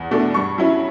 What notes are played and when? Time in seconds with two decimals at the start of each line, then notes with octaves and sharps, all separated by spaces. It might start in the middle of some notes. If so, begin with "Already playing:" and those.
Already playing: E2
0.11 B2 A3 D4
0.34 G2 C#6
0.58 F#3 C#4 E4